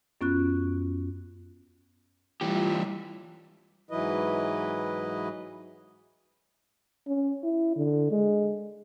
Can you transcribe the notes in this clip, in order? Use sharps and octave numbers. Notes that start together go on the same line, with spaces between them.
F#2 B3 C#4 F4 F#6
E3 G3 F4 G4 E5
G#2 E3 F#3 E4 B4 D#5
C#4
E4
D3
G#3